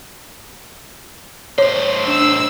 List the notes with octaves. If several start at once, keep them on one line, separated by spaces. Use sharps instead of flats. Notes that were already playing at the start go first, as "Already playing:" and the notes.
A2 C5 C#5
D4 E6